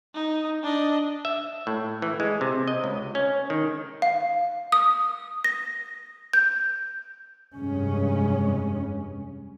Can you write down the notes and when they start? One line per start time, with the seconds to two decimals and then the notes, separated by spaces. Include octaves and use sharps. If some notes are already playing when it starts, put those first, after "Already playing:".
0.15 D#4
0.63 D4 D#5
1.25 E5
1.67 A2
2.02 E3
2.20 G#3
2.41 C3
2.68 D#5
2.84 C#2
3.15 C#4
3.50 D#3
4.02 F5
4.72 D#6
5.44 A#6
6.33 G6
7.55 F1 G2 C#3 G#3 C#4